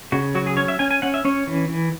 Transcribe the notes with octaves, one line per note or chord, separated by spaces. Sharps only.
C#3 F#4
F#3 F#4
G#4
C#4 C#5
E5
C#4 G#5
G#5
C#4 F#5
E5
C#4 C#5
E3
E3